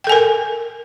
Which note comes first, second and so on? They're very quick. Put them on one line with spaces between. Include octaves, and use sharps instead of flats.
G5 A4 G#5 A#4